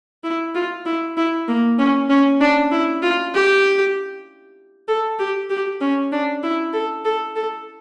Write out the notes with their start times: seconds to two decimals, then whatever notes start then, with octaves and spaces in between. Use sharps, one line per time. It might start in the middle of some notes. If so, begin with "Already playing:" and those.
0.24 E4
0.55 F4
0.86 E4
1.17 E4
1.48 A#3
1.79 C#4
2.09 C#4
2.41 D4
2.71 E4
3.02 F4
3.34 G4
4.88 A4
5.19 G4
5.50 G4
5.81 C#4
6.12 D4
6.43 E4
6.73 A4
7.05 A4
7.36 A4